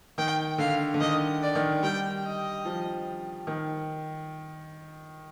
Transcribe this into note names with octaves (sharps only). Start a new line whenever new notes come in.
D#3 G5
D3 F5
D3
D#3 D#5
D5
D#3
G3 G5
D#5
F3
D#3